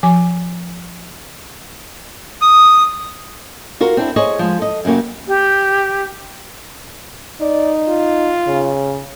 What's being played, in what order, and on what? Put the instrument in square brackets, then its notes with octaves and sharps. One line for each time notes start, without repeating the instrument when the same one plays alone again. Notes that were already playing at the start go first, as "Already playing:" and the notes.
[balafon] F3 G#5 D6
[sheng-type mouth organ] D#6
[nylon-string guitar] F4 F#4 A#4
C4 D4 E4
G#4 C5 C#5 D#5
F3 G#3
A4 D#5
F#2 C#3 A#3 F#4 G4
[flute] G4
[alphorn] D#4 [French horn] D5
[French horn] F4
[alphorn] C#3